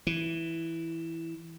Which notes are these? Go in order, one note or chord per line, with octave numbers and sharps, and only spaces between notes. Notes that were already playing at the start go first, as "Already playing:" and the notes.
E3